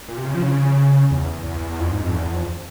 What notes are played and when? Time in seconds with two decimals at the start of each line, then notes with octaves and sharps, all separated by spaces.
0.09 A#2
0.17 C3
0.27 C#3
0.35 F3
0.43 C#3
1.11 E2
1.46 E2
1.80 F2
1.92 G#2
2.04 F2
2.14 E2
2.31 F2